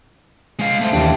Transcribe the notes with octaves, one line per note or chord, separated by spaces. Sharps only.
G#3 F5
A3 C5
D#2 E3 D4